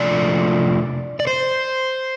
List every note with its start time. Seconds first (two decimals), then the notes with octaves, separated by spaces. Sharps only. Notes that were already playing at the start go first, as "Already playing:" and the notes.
Already playing: C3 F3 A3 D4 D5
1.20 D5
1.27 C5